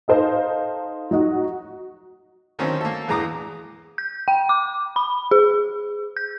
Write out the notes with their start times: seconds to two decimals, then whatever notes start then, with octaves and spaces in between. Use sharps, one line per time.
0.08 D#4 A4 C5 D#5 F5
1.11 F#3 D#4 F#4
2.59 D3 D#3 F#3 A#3 C4 C#4
2.81 A#3 A4
3.08 A#1 E2 G#3 A#5 D6 D#6
3.98 G6
4.28 G5
4.49 D6
4.96 B5
5.31 G#4
6.17 G6